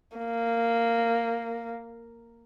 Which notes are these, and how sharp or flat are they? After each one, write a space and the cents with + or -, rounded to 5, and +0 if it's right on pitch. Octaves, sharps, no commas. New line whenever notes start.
A#3 -10